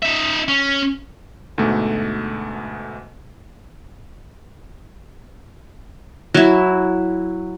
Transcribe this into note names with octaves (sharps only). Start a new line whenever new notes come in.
D#4 E5
C#4
D2 G#2 B2 A3
F#3 E4